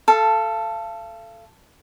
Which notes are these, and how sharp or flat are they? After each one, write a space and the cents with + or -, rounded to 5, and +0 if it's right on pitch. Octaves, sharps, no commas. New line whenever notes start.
A4 +0 F5 -35